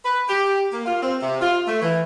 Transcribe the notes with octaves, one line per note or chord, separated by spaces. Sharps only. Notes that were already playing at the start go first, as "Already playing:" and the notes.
B4
G4
A#3
F4
C4
C3
F4
A3
E3